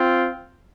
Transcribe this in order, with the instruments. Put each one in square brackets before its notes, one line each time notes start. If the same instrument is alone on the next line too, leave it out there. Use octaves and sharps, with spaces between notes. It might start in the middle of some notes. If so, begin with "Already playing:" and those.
Already playing: [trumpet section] C4 F4